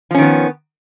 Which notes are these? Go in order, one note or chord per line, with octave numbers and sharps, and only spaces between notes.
D#3 F3 B3 C#4